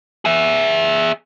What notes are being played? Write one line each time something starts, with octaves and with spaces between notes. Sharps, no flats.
G#4 E5